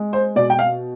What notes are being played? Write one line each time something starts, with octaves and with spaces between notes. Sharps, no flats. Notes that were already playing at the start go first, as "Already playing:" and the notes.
Already playing: G#3
C5
B2 D5
G5
F5